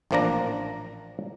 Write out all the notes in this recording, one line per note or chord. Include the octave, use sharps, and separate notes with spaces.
A1 A#2 F3 A#3 D4 A#5